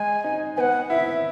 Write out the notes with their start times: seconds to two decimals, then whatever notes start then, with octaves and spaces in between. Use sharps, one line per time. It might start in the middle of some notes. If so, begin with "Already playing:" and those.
Already playing: G#3 G#5
0.24 D#4
0.57 B3 F#5 G#5
0.90 E4 E5